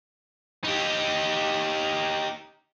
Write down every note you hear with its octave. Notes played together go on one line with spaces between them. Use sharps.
D#4 G4